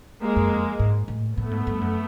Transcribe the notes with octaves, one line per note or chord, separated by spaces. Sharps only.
G#3 A#3
F#2
F2
G#2
A2
A2 A3 B3
G#2
G2
F#2